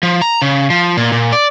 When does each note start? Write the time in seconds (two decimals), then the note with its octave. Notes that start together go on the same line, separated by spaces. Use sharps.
0.03 F3
0.22 A#5
0.42 C#3
0.70 F3
0.97 A#2
1.12 A#2
1.32 D5